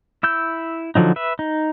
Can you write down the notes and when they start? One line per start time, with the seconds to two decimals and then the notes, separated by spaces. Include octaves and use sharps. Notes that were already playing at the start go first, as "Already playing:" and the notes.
0.23 E4 E6 G6
0.95 D3 F3 F#3 D#4
1.16 B4 E5
1.39 D#4